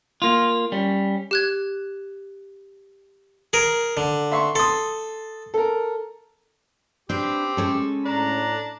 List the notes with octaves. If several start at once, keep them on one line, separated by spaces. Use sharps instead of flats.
A#3 F4
G3 C#4
G4 F#6 G#6
G#4 A#4
D3
E5 C6 C#6
A4 C6 D#6
A4 A#4
C4 D4 G4 B4
G#3 C#4 A4
A2 D4 A#5